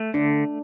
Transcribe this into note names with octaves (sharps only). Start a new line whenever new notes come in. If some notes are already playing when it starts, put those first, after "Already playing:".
Already playing: A3
D3 D4